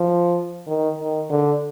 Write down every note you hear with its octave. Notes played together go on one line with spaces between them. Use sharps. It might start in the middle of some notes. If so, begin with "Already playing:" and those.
Already playing: F3
D#3
D#3
D3